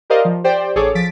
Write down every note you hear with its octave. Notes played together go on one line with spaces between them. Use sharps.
G4 A#4 C5 D5 D#5 F5
F3
G4 C5 D5 G5
A1 G#4 A4 C#5 D6
F3 A6 B6 D7